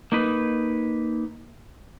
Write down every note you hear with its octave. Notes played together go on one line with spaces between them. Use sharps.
A#3 D#4 B4